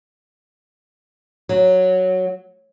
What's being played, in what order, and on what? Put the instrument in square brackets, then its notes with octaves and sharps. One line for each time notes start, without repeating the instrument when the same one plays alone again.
[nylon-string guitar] F#3